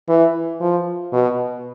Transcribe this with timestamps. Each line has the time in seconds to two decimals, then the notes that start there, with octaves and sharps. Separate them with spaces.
0.08 E3
0.61 F3
1.13 B2